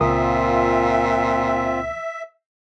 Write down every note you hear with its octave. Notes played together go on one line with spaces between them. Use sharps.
C#2 A#2 C4 F4 A#4 E5 D#6